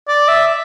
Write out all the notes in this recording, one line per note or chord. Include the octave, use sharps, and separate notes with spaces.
D5
E5